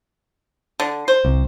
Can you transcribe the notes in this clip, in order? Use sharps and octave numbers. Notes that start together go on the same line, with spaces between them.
D3
C5
C2